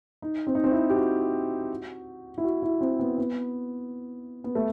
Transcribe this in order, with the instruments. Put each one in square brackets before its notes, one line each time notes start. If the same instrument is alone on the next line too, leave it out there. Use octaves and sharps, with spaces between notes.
[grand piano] D#4
C4
D#4
C4
E4
G4
F#4
E4
F#4
E4
C4
B3
B3
B3
A3